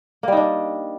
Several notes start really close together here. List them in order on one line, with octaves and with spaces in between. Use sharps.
A#3 G3 D#4 D4